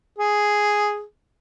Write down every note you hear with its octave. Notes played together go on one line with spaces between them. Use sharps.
G#4